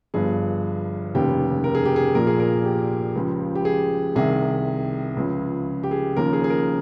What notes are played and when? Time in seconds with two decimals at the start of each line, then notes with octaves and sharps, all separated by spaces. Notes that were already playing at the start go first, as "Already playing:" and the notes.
0.14 G1 G2 F3 G#4
1.15 F1 D#2 C#3 G4
1.64 A#4
1.75 G#4
1.85 G4
1.96 G#4
2.15 A#1 A#2 F3 A#4
2.27 G#4
2.40 A#4
2.65 G4
3.15 C#2 C#3 F3
3.55 G4
3.65 G#4
4.16 C2 C3 D#3 G#4
5.17 C#2 C#3 F3
5.83 G4
5.91 G#4
6.16 D#2 C#3 F3 A#4
6.33 G#4
6.44 G#4
6.50 A#4